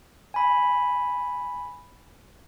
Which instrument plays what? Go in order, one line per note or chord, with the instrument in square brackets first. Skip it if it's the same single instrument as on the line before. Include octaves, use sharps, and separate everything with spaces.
[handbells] G#5 B5